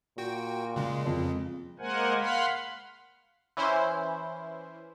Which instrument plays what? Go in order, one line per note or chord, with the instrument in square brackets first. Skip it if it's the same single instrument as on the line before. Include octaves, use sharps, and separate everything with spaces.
[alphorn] A#2 [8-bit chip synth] F#4 G5
[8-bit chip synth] C#3 G#3
[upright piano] F2
[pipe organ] G#3 A#3 A#4 C5 F#5 G#5
F5 F#5 B5 C6
[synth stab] E3 C#4 E4 C5